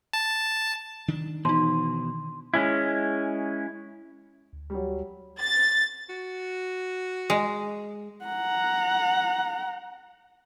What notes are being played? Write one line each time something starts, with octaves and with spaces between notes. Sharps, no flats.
A5
D#3 D4
B2 E3 D#4 C6
G#3 C#4 E4
D2
F#3 G3
A6
F#4
G#3
F#5 A#5